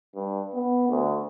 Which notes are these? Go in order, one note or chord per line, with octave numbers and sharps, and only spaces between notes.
G2
B3
D2